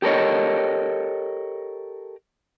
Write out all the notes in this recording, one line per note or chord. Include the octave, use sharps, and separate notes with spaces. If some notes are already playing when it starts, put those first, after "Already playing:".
G4 A4 A#4 C#5 D#5